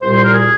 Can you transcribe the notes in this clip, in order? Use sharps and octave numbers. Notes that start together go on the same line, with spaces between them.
C2 A#2 G3 C5
C5
A#4
G#4